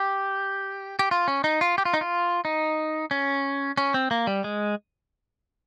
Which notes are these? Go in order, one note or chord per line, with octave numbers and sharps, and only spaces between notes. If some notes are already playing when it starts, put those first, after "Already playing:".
Already playing: G4
G4
F4
C#4
D#4
F4
G4
F4
D#4
F4
D#4
C#4
C#4
C4
A#3
G3
G#3